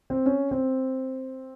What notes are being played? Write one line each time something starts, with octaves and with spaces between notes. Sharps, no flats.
C4
C#4
C4